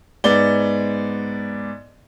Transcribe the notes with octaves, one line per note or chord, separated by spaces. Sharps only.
G#2 B3 D5 G7